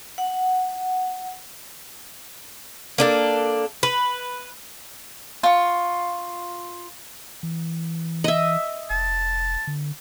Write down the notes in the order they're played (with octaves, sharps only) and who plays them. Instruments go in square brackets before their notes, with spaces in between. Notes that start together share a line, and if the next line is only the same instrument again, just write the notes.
[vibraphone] F#5
[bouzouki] A#3 D4 A4
B4
[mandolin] F4 C#6
[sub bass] E3
[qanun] D#5 E5
[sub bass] F1 [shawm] A5
[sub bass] D3